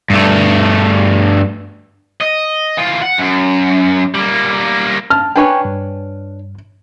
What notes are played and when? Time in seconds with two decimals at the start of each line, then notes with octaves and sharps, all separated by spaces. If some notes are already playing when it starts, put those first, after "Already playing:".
0.10 G2 A3
2.21 D#5
2.77 E3 F4
3.02 F#5
3.18 F#2
4.15 G3 A#3
5.10 A5 F6
5.36 D4 B4 C#5 G5 G#5 C#6
5.65 G2